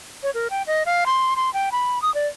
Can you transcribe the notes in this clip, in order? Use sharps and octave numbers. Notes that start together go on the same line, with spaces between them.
C#5
A#4
G5
D#5
F5
C6
C6
G5
B5
D#6
D5